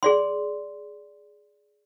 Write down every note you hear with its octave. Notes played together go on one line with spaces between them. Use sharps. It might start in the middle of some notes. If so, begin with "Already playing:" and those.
G#4 D5 C6